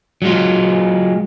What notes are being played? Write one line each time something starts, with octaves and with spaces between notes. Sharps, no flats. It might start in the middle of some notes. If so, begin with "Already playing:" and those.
F#3 G#3 F4